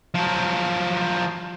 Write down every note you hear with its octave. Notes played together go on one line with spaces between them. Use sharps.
F3 F#3